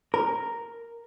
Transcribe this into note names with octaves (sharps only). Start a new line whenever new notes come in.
A#4